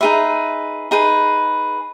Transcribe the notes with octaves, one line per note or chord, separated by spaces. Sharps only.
D#4 G#4 B4 E5
D#4 G#4 B4